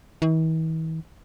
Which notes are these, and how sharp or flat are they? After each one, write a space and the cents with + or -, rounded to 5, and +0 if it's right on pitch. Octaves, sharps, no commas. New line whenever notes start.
E3 -45